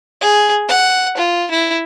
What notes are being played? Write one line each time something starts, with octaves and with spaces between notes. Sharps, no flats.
G#4
F#5
F4
E4